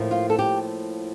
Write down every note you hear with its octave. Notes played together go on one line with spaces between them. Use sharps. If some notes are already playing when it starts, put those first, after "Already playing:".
Already playing: A2 F3 A#3 E4
F4
A4
G4